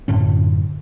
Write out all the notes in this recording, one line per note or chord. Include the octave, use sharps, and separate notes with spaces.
F#2 A2 D3 C#4